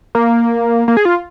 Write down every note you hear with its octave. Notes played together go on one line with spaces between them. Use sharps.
A#3
A#3
G#4
F4